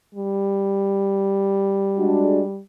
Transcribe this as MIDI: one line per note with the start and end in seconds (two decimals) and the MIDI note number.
0.15 2.60 55
1.98 2.41 56
1.98 2.41 62
1.98 2.41 66